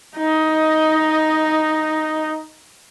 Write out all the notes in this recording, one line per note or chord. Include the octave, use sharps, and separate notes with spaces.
D#4 D#5